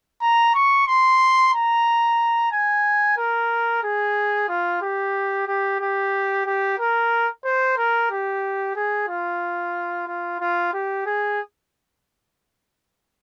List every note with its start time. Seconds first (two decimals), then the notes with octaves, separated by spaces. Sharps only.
0.21 A#5
0.54 C#6
0.87 C6
1.53 A#5
2.52 G#5
3.18 A#4
3.83 G#4
4.49 F4
4.82 G4
5.47 G4
5.80 G4
6.46 G4
6.79 A#4
7.45 C5
7.77 A#4
8.11 G4
8.76 G#4
9.09 F4
10.07 F4
10.40 F4
10.73 G4
11.06 G#4